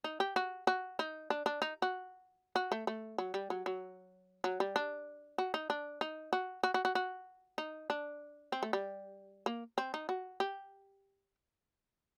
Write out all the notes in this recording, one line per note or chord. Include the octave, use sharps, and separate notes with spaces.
D#4
G4
F#4
F#4
D#4
D4
D4
D#4
F#4
F#4
A3
A3
F#3
G3
F#3
F#3
F#3
G3
D4
F#4
D#4
D4
D#4
F#4
F#4
F#4
F#4
F#4
D#4
D4
C4
A3
G3
A#3
C4
D#4
F#4
G4